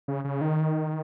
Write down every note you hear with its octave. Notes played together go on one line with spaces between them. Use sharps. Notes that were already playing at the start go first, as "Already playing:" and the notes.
C#3
C#3
D#3